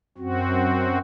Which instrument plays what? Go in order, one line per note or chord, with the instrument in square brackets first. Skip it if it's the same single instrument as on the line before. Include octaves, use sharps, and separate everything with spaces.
[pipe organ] F#2 C4 F#4